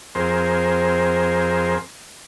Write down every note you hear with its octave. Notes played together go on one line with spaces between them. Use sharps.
F2 C4 G#4 A#4 C5